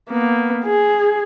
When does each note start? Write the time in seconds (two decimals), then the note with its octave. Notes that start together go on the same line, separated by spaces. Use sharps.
0.10 A#3 B3
0.65 G#4